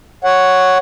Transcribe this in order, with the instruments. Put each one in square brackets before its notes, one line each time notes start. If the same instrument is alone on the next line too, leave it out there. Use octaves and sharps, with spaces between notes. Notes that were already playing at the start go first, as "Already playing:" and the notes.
[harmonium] C#5 F#5